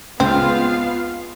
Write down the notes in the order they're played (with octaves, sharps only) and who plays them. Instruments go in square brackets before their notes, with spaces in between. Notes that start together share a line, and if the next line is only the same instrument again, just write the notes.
[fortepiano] C#2 [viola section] B3 F4 F5 [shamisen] C4